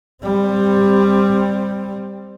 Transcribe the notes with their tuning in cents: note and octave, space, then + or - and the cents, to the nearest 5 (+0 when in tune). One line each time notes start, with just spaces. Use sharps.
G3 +15 C4 +0